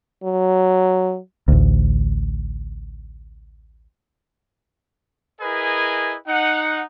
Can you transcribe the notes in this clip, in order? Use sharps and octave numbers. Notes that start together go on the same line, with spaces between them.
F#3
A1 D2
E4 G#4 A#4 B4 D#5 G#5
D#4 F#5